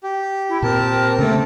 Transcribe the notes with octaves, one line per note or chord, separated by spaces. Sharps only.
G4
E4
A#2 C4 A#4 A5
C#3 A3 A#3 C4 A4